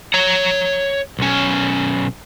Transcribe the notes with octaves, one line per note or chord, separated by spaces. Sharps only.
C#5 A#5
B1 C#4